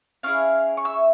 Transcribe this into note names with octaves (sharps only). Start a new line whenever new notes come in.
C#4 E4 G#4 F5 F6
C#6
E5 E6